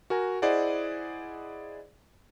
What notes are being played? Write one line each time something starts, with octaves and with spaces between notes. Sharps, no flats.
F#4 A#4 G#5
E4 G#4 C5 D5 D#5 F#5